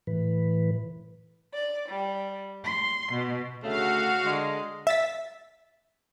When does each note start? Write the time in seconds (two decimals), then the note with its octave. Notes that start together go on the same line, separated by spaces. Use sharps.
0.07 A2 E3 B4
1.52 D5
1.88 G3
2.63 C6
3.12 B2
3.64 D2 C#3 A3 F#4 F5
4.25 D3 G#3
4.87 E5 A6 B6